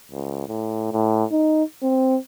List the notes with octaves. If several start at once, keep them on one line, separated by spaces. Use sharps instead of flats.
C#2
A2
A2
D#4
C4